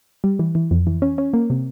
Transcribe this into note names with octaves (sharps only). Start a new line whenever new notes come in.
G3
E3
E3
F2
E3
C#4
C#4
A#3
C3